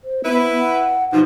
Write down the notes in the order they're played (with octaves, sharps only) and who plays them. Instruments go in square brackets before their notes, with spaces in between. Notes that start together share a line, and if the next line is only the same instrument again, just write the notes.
[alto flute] C5
[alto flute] B3 [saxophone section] E4 B4
[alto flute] F#5
[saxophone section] G2 B2 F3 [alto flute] D#4